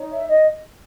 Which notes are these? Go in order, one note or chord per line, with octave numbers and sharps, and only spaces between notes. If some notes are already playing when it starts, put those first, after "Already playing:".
Already playing: D#4 C#5
E5
D#5